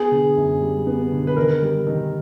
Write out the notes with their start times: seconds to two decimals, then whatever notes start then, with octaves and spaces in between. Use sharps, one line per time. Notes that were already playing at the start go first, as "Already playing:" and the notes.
Already playing: B3 G#4
0.11 D3
0.37 F#2
0.61 G3
0.87 B3
1.12 D3
1.27 B4
1.36 D#3 A#4
1.62 G3
1.87 D#3